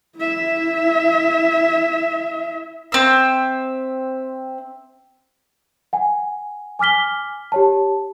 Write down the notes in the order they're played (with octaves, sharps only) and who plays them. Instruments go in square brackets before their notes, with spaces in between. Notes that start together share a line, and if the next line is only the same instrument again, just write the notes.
[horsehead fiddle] E4 E5
[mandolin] C4 E5
[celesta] F#5 G#5
G#5 D6 F6 B6 G7
G4 C#5 A5